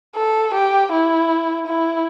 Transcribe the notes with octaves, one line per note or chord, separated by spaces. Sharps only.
A4
G4
E4
E4